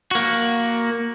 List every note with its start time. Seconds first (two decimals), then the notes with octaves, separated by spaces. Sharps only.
0.11 A#3 F#4